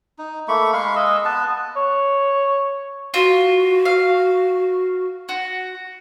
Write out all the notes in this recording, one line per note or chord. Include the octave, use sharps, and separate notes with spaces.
D#4
A3 A#3 B5 C#6
G#3 F5 B5 C#6
G#3 D#5 E6
B3 B4 A5
C#5
F4 F#4
F5
F#4